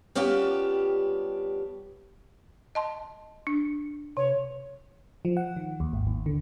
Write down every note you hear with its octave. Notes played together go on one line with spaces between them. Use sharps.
G3 B3 C#4 D4 F4 G4
D#5 A5 C6
D4
C3 C#5
F3
F#5
D#3
D#2
G#1
D#2
D3